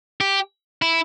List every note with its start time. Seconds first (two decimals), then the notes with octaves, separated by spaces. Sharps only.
0.21 G4
0.82 E4